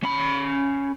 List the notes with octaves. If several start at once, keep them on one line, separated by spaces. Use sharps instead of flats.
C#4 B5